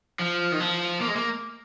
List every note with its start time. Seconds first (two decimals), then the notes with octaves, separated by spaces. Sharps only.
0.19 F3
0.52 D#3
0.60 F3
1.01 A#3
1.08 G#3
1.16 A#3